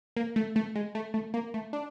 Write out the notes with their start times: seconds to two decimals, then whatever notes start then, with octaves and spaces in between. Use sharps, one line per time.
0.16 A#3
0.36 A3
0.56 A3
0.76 G#3
0.95 A3
1.14 A3
1.34 A#3
1.54 A3
1.73 D4